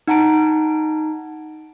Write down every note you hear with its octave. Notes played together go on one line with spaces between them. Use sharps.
D#4 F#5 A5 A#5 D7